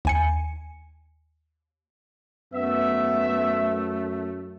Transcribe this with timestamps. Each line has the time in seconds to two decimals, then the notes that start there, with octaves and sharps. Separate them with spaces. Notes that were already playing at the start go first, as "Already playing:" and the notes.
0.05 D#2 G#5 C#7
2.54 F#2 A3 B3 E5